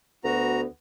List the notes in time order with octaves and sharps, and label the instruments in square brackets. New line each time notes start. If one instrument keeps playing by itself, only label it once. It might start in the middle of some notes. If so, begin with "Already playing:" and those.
[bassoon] D2 [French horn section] B3 [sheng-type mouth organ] F#4 A#5